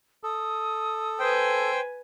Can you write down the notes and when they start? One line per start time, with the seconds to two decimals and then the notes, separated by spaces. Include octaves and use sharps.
0.23 A4 D#6
1.19 B4 C5 G5 G#5